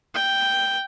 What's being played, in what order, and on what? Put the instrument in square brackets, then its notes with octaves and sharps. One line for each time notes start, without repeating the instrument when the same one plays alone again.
[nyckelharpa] G5